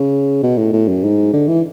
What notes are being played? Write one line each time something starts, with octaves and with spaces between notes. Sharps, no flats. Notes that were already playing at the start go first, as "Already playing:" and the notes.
Already playing: C#3
B2
A2
A2
F#2
G#2
D3
E3